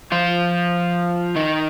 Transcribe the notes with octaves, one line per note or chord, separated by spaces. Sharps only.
F3 F4
D#3 D#4